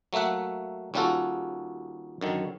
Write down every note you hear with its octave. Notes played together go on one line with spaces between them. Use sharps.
F#3 A3 A#3 E5 F#5
D#2 G3 C#4 F4 F#4 A4
F#2 D3 D#3